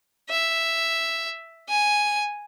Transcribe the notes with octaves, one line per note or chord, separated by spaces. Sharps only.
E5
G#5